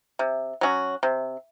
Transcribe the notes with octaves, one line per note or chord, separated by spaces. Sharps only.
C3
F#3 C#4 F#4
C3